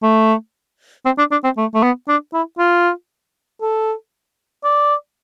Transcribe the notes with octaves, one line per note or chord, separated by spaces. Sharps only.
A3
C4
D4
D4
C4
A3
A3
B3
D4
E4
F4
A4
D5